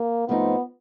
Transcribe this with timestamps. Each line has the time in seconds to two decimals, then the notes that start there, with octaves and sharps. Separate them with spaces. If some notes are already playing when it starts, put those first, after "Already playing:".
Already playing: A#3
0.28 G#2 F3 A3 B3 C4 D#4